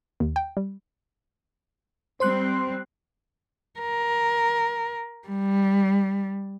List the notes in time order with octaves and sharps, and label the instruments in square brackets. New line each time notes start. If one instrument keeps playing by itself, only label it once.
[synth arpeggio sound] D#2
G5
G3
[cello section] G3 C4 [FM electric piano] C5 C6 F#6
[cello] A#4
G3